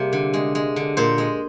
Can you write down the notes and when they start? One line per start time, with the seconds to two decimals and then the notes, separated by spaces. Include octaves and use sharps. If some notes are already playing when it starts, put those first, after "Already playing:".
Already playing: C3 G3 A#3 G#4
0.13 D3
0.34 G#3
0.55 G#3
0.76 D3
0.97 A#2 C5
1.18 G#3